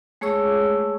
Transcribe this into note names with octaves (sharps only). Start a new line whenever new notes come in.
G#3 A3 G#4 C#5 C#6 E6